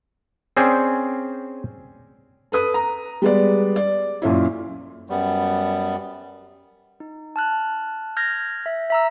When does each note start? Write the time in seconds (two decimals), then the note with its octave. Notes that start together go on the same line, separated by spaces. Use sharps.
0.57 C4 C#4 G#4 C5 D5
2.52 A4 B4 D#6 D#7
2.74 A#5
3.22 G3 G#3 B3 D5
3.76 D5
4.22 F#2 A#2 C#4 E4
5.10 F#2 G3 B3
7.00 D#4
7.36 A5 F6 F#6
8.17 F6 G6 G#6 A#6
8.66 E5
8.90 E5 A#5 E6